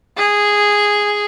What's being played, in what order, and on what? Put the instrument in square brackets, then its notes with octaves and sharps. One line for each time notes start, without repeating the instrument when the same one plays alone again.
[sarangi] G#4